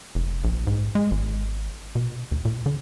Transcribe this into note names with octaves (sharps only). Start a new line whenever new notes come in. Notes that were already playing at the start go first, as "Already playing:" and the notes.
F1
A#1
G#2
G#3
G#1
B2
D#2
A#2
D3